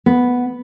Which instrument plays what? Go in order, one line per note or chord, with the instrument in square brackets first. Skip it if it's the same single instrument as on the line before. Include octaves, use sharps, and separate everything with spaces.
[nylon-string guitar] B3